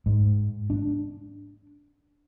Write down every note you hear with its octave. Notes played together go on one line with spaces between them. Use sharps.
G#2
D4